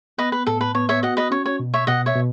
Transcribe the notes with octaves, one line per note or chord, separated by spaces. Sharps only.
B3 B4 D#5
B4
A2 A4
B4
B3 C#5
C#5 E5
F#4 D#5 F#5
B4 D#5
C#4 C#5
C#5
B2
C#5 E5
B2 D#5 F#5
C#5 E5
B2